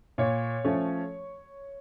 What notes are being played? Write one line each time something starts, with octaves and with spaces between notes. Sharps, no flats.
A#2 C#5
F3 A3 C#4